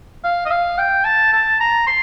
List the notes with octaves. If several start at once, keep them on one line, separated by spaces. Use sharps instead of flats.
F5
D#5
F5
G5
A5
A5
A#5
C6